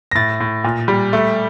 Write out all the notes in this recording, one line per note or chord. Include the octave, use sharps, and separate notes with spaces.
A#6
A2 A6
A2
A#2
G3
A3